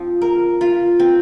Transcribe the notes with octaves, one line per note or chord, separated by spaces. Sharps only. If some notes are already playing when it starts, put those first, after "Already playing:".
Already playing: F3 C4
A#4
F4
C4